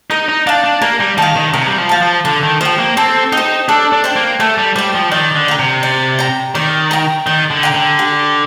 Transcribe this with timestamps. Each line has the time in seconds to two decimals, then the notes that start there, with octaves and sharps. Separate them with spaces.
0.10 D#4 A#4
0.29 D#4
0.47 D4 F5 A5
0.64 D4
0.82 A#3 A#4
1.00 G3
1.18 D#3 F5 A5
1.36 D#3
1.54 C3 A#4
1.67 G3
1.78 F3
1.89 F5 A5
2.02 F3
2.25 D3 A4
2.43 D#3
2.61 F3 C5 G5
2.79 A#3
2.97 C4 A4
3.32 D#4 C5 G5
3.69 D4 A4
3.93 D4
4.04 C5 G5
4.16 A#3
4.40 A3 A4
4.58 G3
4.76 G3 C5 G5
4.95 F3
5.12 D#3 D5
5.36 D3
5.48 G5 A#5
5.59 C3
5.83 D5
6.19 G5 A#5
6.55 D#3 D5
6.91 G5 A#5
7.27 D#3 D5
7.51 D3
7.63 G5 A#5
7.75 D3
7.99 G4